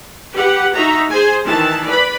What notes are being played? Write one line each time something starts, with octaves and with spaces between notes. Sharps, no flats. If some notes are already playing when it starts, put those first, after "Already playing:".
G4 B4 F#5
D#4 F#4 E5 A#5
G#4 C5 G#5
D#3 E3 A5
B4 D5 B5